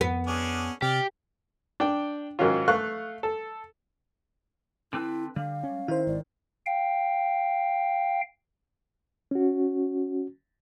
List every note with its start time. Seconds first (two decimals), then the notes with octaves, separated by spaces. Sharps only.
0.01 F2 B3
0.27 C#4 D4 G#4
0.82 C3 G4 D5 F6
1.80 D4 G5
2.39 G#2 D#3 F#3 C#4 F4
2.68 A3 F5 C#6 F#6
3.23 A4
4.93 D3 C4 E4 B4
5.36 D3 G3 F5
5.63 C#4
5.88 D#3 E4 C5
6.07 G#1 D5
6.66 F5 G5
9.31 C#4 F#4